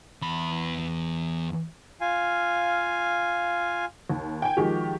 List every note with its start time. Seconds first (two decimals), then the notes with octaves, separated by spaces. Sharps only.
0.22 E2 B5
2.01 F4 F5 G#5
4.10 D#2
4.42 G5 G#5
4.57 D#3 F3 G#3 F#4 G4